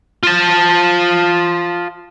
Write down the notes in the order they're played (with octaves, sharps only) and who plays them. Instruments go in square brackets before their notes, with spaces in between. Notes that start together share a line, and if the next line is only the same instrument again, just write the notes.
[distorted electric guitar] F4 A5